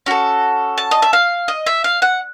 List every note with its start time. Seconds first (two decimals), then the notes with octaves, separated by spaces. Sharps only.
0.06 C#4 F#4 A4
0.78 A5
0.91 D#5
1.02 E5
1.13 F5
1.48 D#5
1.66 E5
1.84 F5
2.02 F#5